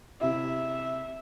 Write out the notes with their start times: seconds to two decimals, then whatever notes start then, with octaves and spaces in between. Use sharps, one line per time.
0.21 C3 E4 E5